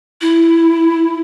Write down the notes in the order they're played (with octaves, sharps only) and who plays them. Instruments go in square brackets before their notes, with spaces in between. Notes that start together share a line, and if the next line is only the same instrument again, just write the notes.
[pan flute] E4